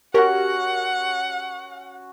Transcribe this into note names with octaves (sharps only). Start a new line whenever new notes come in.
C#4 F#4 G4 A#4 F#5 A#6